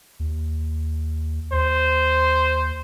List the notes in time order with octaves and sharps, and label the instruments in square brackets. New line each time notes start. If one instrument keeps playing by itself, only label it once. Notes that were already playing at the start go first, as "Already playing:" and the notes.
[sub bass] D#2
[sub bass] D#2 [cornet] C5